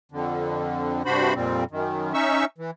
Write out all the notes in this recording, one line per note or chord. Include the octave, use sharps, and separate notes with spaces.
F2 D3
G2 C3 D4 F#4 C5 B5
F2 A#2 G3 C4
F#2 D#3
C#4 D#4 E5 C#6 E6
E3